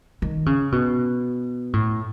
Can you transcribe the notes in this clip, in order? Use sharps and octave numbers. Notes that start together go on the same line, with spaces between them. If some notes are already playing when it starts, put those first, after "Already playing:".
D#3
C#3
B2
A2